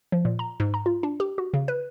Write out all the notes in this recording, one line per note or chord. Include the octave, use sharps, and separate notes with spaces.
F3
A#2
A#5
G#2
A#5
F4
D4
G4
F#4
C#3
B4